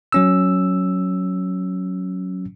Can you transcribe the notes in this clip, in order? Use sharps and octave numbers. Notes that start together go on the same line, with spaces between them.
F#3 C#4 E6